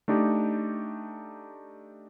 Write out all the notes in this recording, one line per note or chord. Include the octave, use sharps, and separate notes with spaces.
A3 D4 D#4 G4